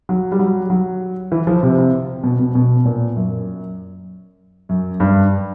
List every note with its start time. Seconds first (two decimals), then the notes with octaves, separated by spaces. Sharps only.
0.09 F#3
0.32 G3
0.39 F#3
0.70 F#3
1.32 E3
1.47 F3
1.63 C3
1.78 C3
2.24 B2
2.39 B2
2.55 B2
2.85 A#2
3.16 F#2
4.69 F#2
5.00 G2